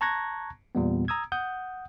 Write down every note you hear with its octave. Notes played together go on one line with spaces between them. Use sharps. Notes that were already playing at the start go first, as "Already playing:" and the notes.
A5 A#5 C#6 F#6 G#6 A#6
E2 A#2 G3 B3
A#5 D#6 E6 G#6
F#5 D#6 G6